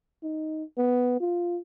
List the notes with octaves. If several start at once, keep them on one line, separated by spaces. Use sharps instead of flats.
D#4
B3
F4